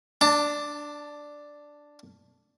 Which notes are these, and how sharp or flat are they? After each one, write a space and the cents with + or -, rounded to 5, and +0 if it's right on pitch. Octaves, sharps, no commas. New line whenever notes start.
D4 +0 A5 +35